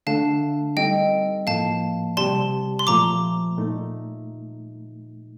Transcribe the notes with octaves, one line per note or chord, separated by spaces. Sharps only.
D3 A3 D4 A4 F5 A5
G3 C4 D#4 A4 D#5 G5
A2 F3 A#3 F5 A5
C3 G3 C4 G4 D5 A5 C6
C6
A#2 F3 A3 A#5 D6
A#2 A3 D#4